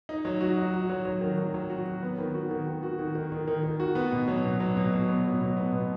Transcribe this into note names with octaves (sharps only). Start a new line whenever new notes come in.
D#4
F#3
F#4
D#4
F#4
F#3
F#3
D#3
F#3
F#3
F#4
F#3
B3
D#3
F#4
D#3
D#3
F#4
D#3
D#3
D#3
D#3
D#3
F#4
B3
B2
F#3
B2
F#3
B2
F#3
B3
F#3
B2
B3
B2